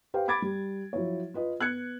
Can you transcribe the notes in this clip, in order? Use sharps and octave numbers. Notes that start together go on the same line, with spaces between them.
G4 B4 C5 F5 G5
B5 D6 G#6 A6 D7
G3
F3 F#3 E4 C#5
F4 B4 D#5
B3 F#6 G#6 C#7